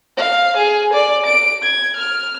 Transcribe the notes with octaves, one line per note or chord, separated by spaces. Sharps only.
F5
G#4
D5
D7
G#6
F6